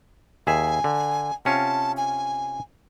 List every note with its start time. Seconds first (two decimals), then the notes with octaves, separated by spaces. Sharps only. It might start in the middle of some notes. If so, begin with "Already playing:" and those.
0.47 D#2 G#4 E5 G#5
0.84 D3
1.45 C3 C#4 F4 A5
1.97 G#5